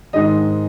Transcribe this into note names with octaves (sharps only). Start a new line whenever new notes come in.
G#2 D#3 G#3 D#5